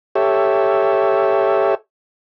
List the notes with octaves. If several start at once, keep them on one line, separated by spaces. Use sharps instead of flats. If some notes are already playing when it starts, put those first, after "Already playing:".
G4 A4 C#5 E5